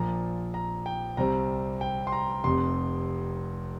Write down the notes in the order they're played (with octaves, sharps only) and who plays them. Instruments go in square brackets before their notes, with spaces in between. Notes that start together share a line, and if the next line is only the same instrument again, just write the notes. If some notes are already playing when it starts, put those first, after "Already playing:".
Already playing: [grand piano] A#1 A#2 F3 A#5
A#5
G5
C2 C3 G3 C4 A#5
G5
C6
A#5
F1 F2 C3 C6